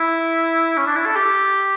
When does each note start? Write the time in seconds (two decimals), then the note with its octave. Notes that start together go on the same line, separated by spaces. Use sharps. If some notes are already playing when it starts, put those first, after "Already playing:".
Already playing: E4
0.77 C#4
0.86 D4
0.96 E4
1.06 A4
1.16 G4